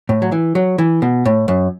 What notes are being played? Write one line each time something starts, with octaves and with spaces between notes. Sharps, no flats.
A2
F#3
E3
F#3
E3
B2
A2
F#2